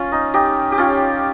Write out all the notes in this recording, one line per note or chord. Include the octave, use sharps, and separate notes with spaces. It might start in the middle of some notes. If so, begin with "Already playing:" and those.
Already playing: C#4 F4
D#4
D#4 G4
G4
C#4 F4